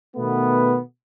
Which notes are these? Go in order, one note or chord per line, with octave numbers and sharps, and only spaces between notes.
B2 D#3 A3 B3